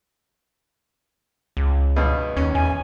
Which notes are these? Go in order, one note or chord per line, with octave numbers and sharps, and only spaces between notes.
C#2
G2 B2
D#2 C#4
E2 G#5